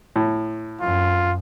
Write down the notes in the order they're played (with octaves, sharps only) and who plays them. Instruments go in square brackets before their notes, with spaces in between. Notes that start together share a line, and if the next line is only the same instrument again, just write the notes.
[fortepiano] A2
[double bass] F#2 [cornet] F4